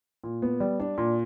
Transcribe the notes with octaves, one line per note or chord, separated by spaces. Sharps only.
A#2
B3
G3
D4
A#2